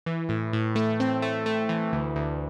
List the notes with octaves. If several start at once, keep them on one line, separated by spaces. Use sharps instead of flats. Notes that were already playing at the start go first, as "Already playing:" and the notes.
E3
A2
A2
A3
C4
A3
A3
E3
D2
D2